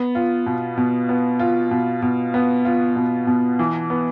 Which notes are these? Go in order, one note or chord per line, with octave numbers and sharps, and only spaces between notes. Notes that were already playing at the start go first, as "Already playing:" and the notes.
Already playing: B3
F4
B2
B2
B3
F4
B2
B2
B3
F4
B2
B2
E3
B3